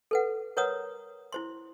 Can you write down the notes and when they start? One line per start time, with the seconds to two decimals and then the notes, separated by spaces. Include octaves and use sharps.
0.11 A4 B4 F#5
0.57 A#4 B4 C#5 F#5 A#5 D#6
1.32 E4 C5 C6